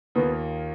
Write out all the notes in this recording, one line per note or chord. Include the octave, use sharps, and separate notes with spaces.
D#2 D#3 A#3 B3 F4